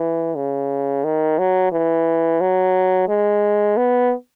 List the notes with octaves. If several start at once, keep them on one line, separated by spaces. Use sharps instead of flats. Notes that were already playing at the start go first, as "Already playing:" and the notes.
Already playing: E3
C#3
D#3
F#3
E3
F#3
G#3
B3